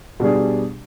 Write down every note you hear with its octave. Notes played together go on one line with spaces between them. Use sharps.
B2 G3 D4 G#4